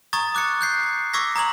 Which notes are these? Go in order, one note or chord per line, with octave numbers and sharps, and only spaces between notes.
A#5 C#6 D#6 G#6 A6
D6 F#6 G#6 C#7
F#6 G6 C7
C#6 D6 E6 G#6 A#6 B6
A#5 D#6 G#6 F#7